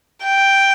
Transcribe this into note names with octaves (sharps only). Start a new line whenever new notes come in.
G5